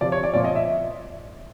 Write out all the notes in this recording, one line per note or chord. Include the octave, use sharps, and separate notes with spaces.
C3 F3 D5
C#5
D5
A#2 F3 D5
D#5
E5